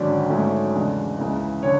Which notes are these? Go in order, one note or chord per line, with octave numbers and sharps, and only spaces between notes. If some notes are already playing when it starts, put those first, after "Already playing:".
Already playing: G#1 F#2 D3 F#3 C#4 D5
G#2 F#3 A3 C#4
E2 C#3 G#3 D4
C#2 C#3 E3
D3 C#5